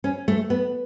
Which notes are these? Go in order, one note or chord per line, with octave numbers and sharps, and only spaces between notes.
C#4
A3
B3